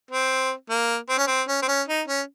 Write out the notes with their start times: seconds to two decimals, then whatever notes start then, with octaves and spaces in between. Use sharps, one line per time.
0.11 C4
0.70 A#3
1.09 C4
1.18 C#4
1.27 C4
1.48 C#4
1.62 C4
1.68 C#4
1.88 D#4
2.08 C#4